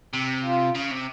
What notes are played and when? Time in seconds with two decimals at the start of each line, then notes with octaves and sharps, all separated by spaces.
0.13 C3
0.44 F4
0.75 C#3
0.91 C3